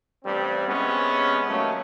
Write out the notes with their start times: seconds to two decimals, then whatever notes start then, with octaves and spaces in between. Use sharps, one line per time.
0.23 A1 G2 G3 C4
0.68 C3 G#3 B3 C#4
1.47 D#2 F#3 A3 C#4